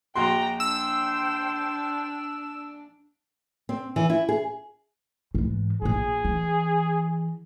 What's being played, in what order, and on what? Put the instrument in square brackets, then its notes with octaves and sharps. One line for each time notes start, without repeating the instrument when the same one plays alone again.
[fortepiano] A#1 F#4 C6 [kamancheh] G5 A#5
[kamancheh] D4 [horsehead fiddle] C5 G5 [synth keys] E6
[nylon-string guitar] C4
E3
E4
G#4
[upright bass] G#2 E3
[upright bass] D1 A#1 [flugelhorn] G#4
[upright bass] E3